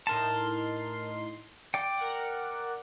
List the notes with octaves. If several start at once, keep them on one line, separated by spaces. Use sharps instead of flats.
A2 D#4 A#4 A5 C6
D5 G5
A#4 F#5